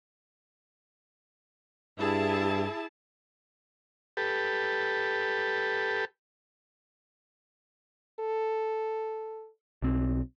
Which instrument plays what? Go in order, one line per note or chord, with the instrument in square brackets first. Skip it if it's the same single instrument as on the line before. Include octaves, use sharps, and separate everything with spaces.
[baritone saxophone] G2 [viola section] E4 G#4 A5
[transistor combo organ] G4 A4 B4
[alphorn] A4
[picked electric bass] B1 C4